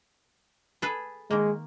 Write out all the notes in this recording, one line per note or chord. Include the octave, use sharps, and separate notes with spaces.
G#4 A4 B4
D#3 G#3 A#3